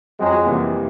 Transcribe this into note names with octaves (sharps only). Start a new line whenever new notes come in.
F2 F#3 G#3
C3 E3 G3 A#3